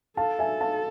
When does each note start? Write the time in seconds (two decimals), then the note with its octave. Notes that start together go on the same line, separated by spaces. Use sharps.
0.17 A4 F5 A5
0.39 E5 G#5
0.61 F5 A5